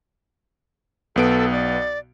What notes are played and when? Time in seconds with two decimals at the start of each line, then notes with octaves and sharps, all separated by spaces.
1.16 B1 B3 A4 D7
1.52 D5